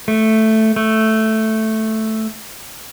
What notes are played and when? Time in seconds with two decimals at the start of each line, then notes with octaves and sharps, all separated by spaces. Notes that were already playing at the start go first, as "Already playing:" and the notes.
0.08 A3
0.76 A3